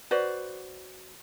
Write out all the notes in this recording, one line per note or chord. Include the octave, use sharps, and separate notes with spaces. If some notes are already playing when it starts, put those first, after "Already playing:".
F#4 B4 C5 D5